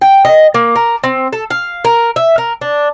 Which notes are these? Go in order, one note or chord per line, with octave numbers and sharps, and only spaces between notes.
G5
D#5
A#3
A#4
C4
A4
F5
A#4
E5
A#4
D4